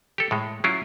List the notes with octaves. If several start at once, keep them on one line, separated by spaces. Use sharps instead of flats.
G4 A4
A2 G#3
F#3 C#4 E4 F4